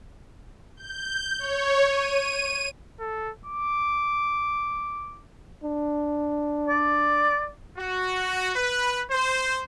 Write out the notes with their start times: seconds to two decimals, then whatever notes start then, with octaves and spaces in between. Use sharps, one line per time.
0.76 G6
1.39 C#5
1.88 D#7
3.00 A4
3.46 D6
5.64 D4
6.68 D5
7.78 F#4
8.56 B4
9.11 C5